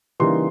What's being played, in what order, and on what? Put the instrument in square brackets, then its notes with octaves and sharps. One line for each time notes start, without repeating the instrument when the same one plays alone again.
[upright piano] C#3 E3 G3 A#3 D#4 C6